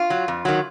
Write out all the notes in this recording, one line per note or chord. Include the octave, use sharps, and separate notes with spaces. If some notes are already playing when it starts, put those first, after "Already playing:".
Already playing: F4
F#3
F2
D#3 F#3